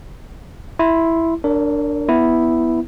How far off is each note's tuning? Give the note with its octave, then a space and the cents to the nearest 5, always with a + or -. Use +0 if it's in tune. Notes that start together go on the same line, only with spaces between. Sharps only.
E4 +0 C6 +0
D4 +0 A#4 -15 C#5 +45
B3 +0 E4 +0